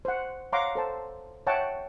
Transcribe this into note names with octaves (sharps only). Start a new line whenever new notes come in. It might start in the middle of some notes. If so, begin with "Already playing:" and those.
C5 F#5
C#5 F5 F#5 A#5 C6 D6
A4 C5 A5
C#5 E5 F#5 G5 A5